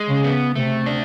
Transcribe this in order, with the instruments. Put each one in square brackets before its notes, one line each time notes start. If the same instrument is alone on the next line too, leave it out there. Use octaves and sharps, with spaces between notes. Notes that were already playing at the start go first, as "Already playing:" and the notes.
Already playing: [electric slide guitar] G#3
[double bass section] C#3
[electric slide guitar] B3
[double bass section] C3 [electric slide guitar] A3
[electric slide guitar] D4